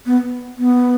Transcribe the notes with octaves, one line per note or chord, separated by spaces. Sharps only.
B3
B3